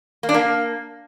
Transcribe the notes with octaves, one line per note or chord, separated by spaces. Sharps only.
A#3
D4
A#3